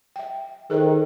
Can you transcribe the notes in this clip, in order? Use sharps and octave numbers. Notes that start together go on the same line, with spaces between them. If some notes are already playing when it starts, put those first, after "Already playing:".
E5 G5
D#3 G#4 A4 C5